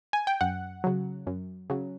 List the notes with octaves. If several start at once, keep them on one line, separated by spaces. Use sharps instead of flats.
G#5
G5
F#2 F#5
C#3 F#3
F#2
C#3 F#3